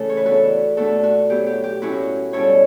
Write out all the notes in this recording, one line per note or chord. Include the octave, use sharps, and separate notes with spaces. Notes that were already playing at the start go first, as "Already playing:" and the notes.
Already playing: C#3 E3 A3 E4 A4
C#5
B4
E3 B3 D4 F#4 A4
B2 A3 D4 F#4 A4
F#4
F#3 B3 E4 G4
G4
G4
A2 F#3 C#4 E4 F#4
B2 G3 C#4 E4 A4 C#5